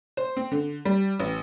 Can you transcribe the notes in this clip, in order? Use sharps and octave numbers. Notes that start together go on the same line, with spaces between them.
C5
C4
D3
G3
A1